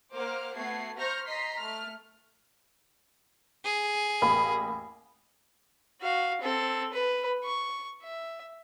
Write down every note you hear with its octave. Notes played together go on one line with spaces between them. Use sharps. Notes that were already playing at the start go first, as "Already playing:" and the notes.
A#3 A#4 C5 F#5 D6 F6
A3 B3 F#4 F#5 G#6 C7
C5 A#5 C#6 F6 G6 A#6
D#5 A#5 C6 B6 C7
A3 F6
G#4
A1 A#3 B5
F#4 F5
C4 A4
B4
C#6
E5